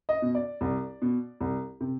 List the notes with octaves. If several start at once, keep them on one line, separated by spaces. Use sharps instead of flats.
D#5
B2
D5
C2
B2
C2
C3